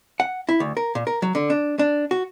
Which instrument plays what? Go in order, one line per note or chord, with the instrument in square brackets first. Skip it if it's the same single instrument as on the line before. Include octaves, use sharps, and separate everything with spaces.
[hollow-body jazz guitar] F#5
E4
D2
A#4
A#2
A#4
F#3
D3
D4
D4
F#4